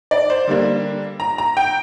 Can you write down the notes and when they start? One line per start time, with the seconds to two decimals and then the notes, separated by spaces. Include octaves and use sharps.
0.11 D5
0.30 C5
0.47 D3 G3 A#3 D4
1.20 A#5
1.38 A#5
1.57 G5